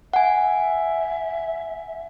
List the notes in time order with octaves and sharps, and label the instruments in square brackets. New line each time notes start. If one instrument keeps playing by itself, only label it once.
[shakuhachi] E5 [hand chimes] F#5 G#5